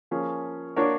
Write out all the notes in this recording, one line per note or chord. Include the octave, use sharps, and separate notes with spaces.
F3 A#3 C#4 F4 G#4
A#3 D4 F#4 A#4 C#5